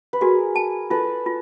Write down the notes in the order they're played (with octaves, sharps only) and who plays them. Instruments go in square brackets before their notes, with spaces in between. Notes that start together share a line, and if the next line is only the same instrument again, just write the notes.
[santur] B4
[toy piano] F#4 [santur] G#4 A#4
[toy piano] A5
[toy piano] F4 [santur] A4 B4
[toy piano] F4